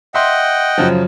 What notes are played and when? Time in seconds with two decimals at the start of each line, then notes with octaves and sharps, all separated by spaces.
0.14 D#5 E5 F#5 G5 C6
0.78 F#2 C#3 F3